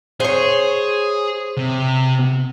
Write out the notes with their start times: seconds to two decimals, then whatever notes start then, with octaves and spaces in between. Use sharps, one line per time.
0.20 G#4 C5 C#5
1.58 C3